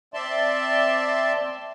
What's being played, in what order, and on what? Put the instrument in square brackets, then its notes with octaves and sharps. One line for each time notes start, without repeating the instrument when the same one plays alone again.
[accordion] C4 D5 E5 A5 C6